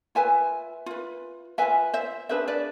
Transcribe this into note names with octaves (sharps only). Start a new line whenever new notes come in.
F4 B4 E5 G#5
F4 B4
F4 B4 E5 G#5
C5 E5
D4 G#4 B4 C5 E5
B4 D5